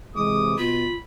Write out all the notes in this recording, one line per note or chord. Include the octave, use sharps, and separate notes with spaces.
C3 E3 G#3 D6 D#6
B2 B3 F4 B5